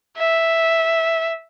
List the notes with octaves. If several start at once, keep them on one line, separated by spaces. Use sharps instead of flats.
E5